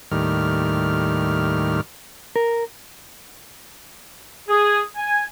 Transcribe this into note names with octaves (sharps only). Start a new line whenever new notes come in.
D#2 A2 D#3 G3 F6
A#4
G#4
G#5